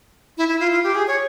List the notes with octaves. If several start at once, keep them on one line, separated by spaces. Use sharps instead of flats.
E4
E4
F4
F4
G4
G#4
C#5